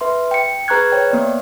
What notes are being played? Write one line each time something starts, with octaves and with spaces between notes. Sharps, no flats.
B4 E5 C6
G5 C#7
G#4 B4 A#5 C#6 F#6 G#6
C5 C#5 G5
A#3 B3 C5 D5